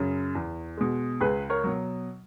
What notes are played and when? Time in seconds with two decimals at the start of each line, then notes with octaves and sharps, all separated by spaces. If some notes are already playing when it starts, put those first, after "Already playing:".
Already playing: F#2 C#3
0.35 E2
0.77 B2 G#3
1.21 C#2 G#4 B4
1.50 A#4 C#5
1.64 B2 F#3